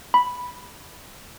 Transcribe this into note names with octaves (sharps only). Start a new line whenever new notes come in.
B5